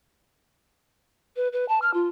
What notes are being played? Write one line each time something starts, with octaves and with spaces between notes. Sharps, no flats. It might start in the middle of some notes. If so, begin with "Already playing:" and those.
B4
B4
A5
F6
F4